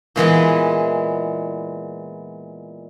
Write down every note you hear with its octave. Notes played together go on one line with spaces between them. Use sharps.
A#2 E3 G#3 B3